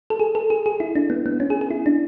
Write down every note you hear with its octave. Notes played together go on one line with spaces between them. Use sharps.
A4
G#4
A4
G#4
G#4
E4
D4
B3
B3
C#4
G#4
G#4
E4
D4